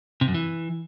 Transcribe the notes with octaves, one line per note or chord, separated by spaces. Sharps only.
C3
F#2
E3